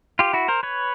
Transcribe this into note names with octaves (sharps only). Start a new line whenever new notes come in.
F4 G4
E4 F#4
A#4 C5
B4 C#5